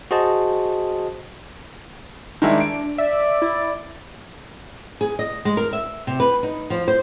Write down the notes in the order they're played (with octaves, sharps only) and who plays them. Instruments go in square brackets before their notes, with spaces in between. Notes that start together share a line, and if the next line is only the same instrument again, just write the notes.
[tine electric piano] F#4 G#4 C5 D#5 A5
[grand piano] D#3 G#3 E4 [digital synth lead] D4
[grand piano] D7
[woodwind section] D5 [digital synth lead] E5
[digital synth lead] E4
[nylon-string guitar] G#4
D#5
G#3
A#4
E5
C3
B4
D#4
F3
C5